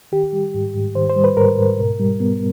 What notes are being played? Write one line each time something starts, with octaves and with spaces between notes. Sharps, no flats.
D#3 G4
G3
G#2
G#2
D#3 C5
C5
G3
B4
G#2 A#4
G#2
B2
G3
B3